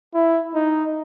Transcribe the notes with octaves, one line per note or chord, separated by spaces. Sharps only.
E4
D#4